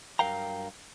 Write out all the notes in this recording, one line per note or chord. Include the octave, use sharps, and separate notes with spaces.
G2 F#3 A#4 F5 G5 A#5